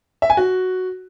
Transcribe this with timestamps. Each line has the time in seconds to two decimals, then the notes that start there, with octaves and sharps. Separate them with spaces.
0.22 E5
0.30 G#5
0.37 F#4